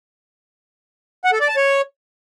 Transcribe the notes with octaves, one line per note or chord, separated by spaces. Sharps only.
F#5
A4
D5
A5
C#5